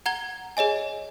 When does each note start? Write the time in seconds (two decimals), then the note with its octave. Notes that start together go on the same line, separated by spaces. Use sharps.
0.06 F#5 A#5 G#6 G7
0.57 G#4 C#5 D#5 G#5